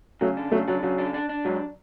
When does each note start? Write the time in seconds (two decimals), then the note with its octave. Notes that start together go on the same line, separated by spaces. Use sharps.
0.21 C#3 F#3 A3
0.37 D4
0.52 C#3 F#3 A3
0.68 F#3 D4
0.83 C#3 F#3
0.98 D4
1.14 D4
1.29 D4
1.45 G#2 F#3